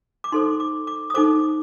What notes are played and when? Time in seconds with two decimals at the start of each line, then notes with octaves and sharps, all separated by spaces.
0.24 D6
0.32 D#4 A4 C5 C6
0.60 D6
0.87 D6
1.10 D#6
1.14 D#4 A4 C5 D6